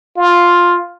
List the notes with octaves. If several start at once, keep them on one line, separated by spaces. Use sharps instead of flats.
F4